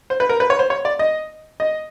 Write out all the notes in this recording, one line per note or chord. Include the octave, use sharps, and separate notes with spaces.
C5
B4
A#4
B4
C#5
C5
C#5
D5
D#5
D#5